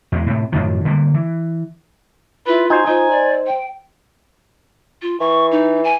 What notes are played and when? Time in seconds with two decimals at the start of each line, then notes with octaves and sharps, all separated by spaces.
0.12 E2 G#3
0.26 A2 C3
0.52 F#2 A2 D#3 F3
0.85 D3 G3 A#3
1.14 E3
2.47 E4 F4 B4
2.70 D#4 F#4 C5 G#5
2.87 D#4 F4 C5
3.10 D5
3.47 G5
5.02 F4
5.20 E3 C#6
5.51 D#4
5.84 G#5